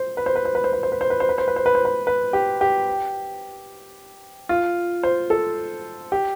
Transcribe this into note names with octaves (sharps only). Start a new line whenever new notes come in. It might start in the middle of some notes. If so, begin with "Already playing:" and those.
Already playing: C5
B4
C5
B4
C5
B4
C5
B4
C5
B4
C5
B4
C5
B4
C5
B4
C5
B4
C5
B4
B4
G4
G4
F4
C5
A4
G4